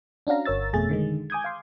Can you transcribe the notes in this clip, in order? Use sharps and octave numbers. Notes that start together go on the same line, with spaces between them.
C#4 D4 F#4 F5 A#5
G1 A#4 C#5 E6 A6
F2 B2 A3 G#4 A6
D3 D#3 G#3
G#5 D6 D#6 G6 G#6
F5 C6